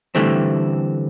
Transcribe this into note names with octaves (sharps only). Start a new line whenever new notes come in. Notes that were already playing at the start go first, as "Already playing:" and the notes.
D3 E3 G3 A3 C4